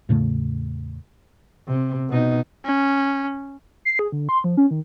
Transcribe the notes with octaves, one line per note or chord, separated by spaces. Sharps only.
E2 A2 C#3 A3
C3
B2 D#4
C#4
C7
G#4
D3
C6
F3
C#4
D#3